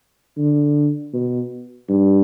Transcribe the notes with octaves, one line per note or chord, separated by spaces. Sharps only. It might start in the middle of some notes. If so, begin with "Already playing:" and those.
D3
B2
G2